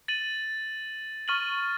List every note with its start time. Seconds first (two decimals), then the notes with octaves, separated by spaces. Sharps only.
0.08 A6 D#7 F#7
1.28 C#6 F6 A6 D#7 F#7